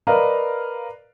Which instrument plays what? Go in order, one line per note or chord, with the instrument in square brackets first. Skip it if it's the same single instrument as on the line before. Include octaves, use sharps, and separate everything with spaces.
[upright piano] A#4 B4 D5 D#5 F5 A#5